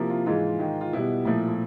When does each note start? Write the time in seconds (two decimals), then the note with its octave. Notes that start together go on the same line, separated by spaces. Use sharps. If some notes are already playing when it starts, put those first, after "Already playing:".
Already playing: C3 F3 A#3 E4
0.09 F4
0.26 G#2 E3 G#3 F4
0.59 G#2 D#3 G#3
0.81 F4
0.93 B2 G3 B3 E4
1.25 A#2 F3 A3 E4
1.49 E4